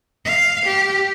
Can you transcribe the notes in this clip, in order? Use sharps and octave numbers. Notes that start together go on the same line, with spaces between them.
F5
G4